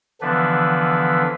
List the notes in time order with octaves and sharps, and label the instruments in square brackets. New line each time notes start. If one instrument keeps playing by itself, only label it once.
[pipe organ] D3 E3 F3 B3 D4 B4